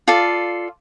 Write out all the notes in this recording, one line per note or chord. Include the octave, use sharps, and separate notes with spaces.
F4 A4 D5 F5